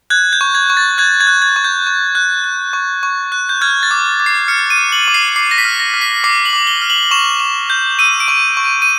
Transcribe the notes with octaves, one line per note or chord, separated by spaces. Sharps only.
F#6 G#6
G6
C#6
G#6
C#6
A6
F#6 G#6
G#6
F#6
G#6
C#6
G6
C#6
F#6
F#6
C#6
C#6
F#6
G6
F6 G#6
A6
D6
D6
C7
F6 C#7
D#7
F6
F#7
D6
C7
D6 C7
A#6
B6
F6
A#6
F6
B6
D6 C7
F#7
D6
G7
F6
F#7
C#6 E7
C#6
G6
E6 D#7
D7
C#6
C#6
D#7
D#7